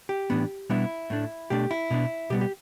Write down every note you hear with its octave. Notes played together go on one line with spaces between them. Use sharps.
G4
A2 E3 B3 D4
B2 G3 B3 D4 E4
A2 A3 D4
B2 A3 D4 G4
E4
B2 B3 D4
B2 G3 B3 G4
G4